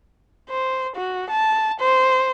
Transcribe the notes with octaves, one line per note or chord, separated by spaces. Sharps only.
C5
F#4
A5
C5